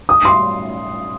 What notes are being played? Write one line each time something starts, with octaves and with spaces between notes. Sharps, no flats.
D#6
C6